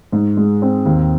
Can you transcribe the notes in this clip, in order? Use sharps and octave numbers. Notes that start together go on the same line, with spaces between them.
G#2
G#3
C4
D#2